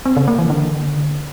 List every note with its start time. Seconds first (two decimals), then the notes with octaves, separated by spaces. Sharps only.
0.05 C4
0.17 C#3
0.28 A#3
0.39 E3
0.50 D3